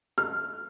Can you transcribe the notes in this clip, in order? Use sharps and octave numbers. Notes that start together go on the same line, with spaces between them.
F6